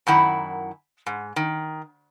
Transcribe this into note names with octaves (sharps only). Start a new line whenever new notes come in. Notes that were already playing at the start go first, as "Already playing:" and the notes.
F#2 D#3 E4 F#5
G#2
D#3